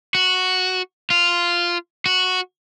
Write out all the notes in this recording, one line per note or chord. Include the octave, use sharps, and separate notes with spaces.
F#4
F4
F#4